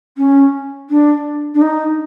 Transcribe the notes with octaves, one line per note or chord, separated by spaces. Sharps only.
C#4
D4
D4
D#4